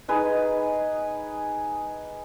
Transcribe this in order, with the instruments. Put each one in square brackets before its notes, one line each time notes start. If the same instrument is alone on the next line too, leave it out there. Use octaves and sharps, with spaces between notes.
[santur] D#4 G#4 B4 D#5